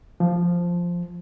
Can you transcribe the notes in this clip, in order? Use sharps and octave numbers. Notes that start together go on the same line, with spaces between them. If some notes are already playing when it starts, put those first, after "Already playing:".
F3